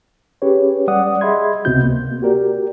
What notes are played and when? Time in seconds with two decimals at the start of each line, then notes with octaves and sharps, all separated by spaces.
0.42 C#4 G4 G#4 B4 C#5
0.88 G3 D5 F#5 D#6
1.21 G#4 D#5 E5 B5 C6 G#6
1.65 C#2 C3 B3 C4 F#4 G6
1.83 A#3
2.22 F#4 G4 A#4 D5